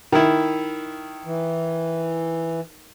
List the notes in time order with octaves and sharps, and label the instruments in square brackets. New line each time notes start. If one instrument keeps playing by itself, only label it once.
[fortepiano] D#3 E4
[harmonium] E3